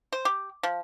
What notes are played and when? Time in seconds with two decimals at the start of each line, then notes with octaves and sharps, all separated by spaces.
0.12 C5
0.25 G4
0.63 F3